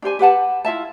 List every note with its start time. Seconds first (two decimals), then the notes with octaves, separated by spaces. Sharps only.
0.02 D4 G4 C5 G#5
0.19 G4 B4 F#5 A5
0.65 E4 F4 E5 A5